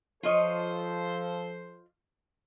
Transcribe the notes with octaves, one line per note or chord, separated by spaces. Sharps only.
F3 F4 A4 C5 C#5 D#5